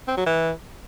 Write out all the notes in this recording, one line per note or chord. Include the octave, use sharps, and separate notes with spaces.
C4
F#3
E3